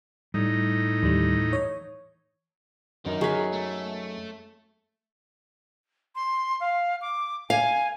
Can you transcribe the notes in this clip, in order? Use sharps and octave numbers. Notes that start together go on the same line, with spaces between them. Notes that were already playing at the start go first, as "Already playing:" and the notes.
A2 G3 D#4
D#2 E3 G3
C#5
F#2 D#3 D#4 A#4
F#3 G#4 B4 C#6
A3
C6
F5
D6
F5 G#5